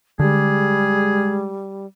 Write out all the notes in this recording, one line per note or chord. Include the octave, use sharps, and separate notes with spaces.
D3 G3 G#3 G#4